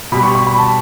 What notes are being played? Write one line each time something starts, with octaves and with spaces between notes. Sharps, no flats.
B2 G3 B5
C#6
C#6
B5
A5